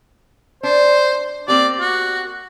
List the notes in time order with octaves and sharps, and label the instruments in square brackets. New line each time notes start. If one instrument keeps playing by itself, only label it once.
[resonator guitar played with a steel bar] D4 [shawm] C5
[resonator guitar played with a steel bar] A#3 C4 G4 [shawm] D5
[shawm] F#4